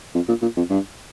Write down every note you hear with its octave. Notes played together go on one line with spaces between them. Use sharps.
F2
A#2
A#2
F2
G2